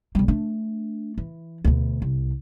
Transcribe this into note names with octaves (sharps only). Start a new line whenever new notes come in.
B1 G3
A3 D4
E3
D2 B2
C2